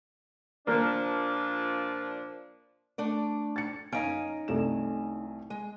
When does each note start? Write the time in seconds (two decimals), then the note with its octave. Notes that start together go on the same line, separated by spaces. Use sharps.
0.67 A#2 F3 A#3 D4
2.98 A3 D4 D5
3.56 A6 C#7
3.92 F#2 C#4 D#4 F5 G#5 D7
4.48 C2 A3 E7
5.50 G#3